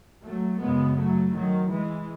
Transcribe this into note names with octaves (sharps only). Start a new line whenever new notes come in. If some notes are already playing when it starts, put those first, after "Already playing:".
F#3 A3
F#2 C#3 G#3 B3
F#3 A3
D#3 F#3
E3 G#3